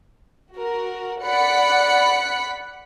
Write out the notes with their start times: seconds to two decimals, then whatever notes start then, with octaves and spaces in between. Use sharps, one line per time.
0.55 F#4 A#4
1.24 D5 F#5 B5 F#6 B6 C#7